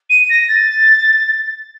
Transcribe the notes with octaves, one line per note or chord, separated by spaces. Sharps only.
D#7
A#6
A6